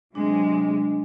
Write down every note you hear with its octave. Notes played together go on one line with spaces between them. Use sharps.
C3 F#3 G#3 D4